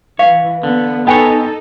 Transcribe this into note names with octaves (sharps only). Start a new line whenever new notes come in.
E3 C#5 F5
D3 B3
B3 D#4 A4 B4 C#5 G5 G#5